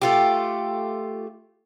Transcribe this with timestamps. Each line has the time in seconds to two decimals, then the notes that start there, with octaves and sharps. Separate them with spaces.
0.02 A3 F4 G4